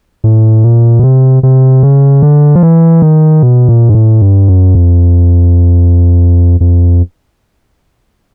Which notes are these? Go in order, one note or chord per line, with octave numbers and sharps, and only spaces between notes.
A2
A#2
B2
C3
C3
C#3
D3
F3
E3
D#3
B2
A#2
G#2
A2
G2
F#2
F2
F2